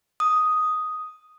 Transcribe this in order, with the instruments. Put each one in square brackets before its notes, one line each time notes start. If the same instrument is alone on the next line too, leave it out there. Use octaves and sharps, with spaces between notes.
[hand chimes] D#6